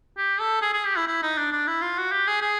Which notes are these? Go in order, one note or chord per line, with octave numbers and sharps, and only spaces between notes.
G4
A4
G#4
G#4
G4
E4
E4
D#4
D4
D4
E4
F4
F#4
G4
G#4
G#4